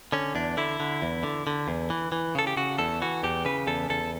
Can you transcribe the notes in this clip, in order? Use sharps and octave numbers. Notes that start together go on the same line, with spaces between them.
D3 C#4
E2 D4
D3 E4
D3
E2
D3
D3
E2
E3
E3
C#3 A4
G4
C#3 F#4
E2 A4
E3 F#4
E2 G4
C#3 B4
E2 A4
E2 A4